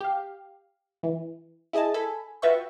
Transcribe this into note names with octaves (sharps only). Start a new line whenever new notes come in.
G4 F5
E3
E4 G#4 D#5 G#5 A5
A4 G#5 B5
F4 F#4 B4 E5 G5 C#6